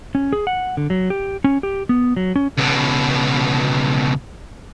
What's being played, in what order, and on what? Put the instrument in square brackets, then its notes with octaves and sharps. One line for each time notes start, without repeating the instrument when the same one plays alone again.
[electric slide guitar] C#4
G#4
F#5
D3
F#3
G4
C#4
G4
B3
F#3
C#4
[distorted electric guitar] C#2 B2